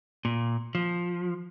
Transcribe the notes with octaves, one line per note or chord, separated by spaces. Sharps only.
A#2
F3